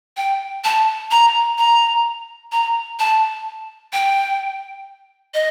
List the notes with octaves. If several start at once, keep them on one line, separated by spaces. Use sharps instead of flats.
G5
A5
A#5
A#5
A#5
A5
G5
D#5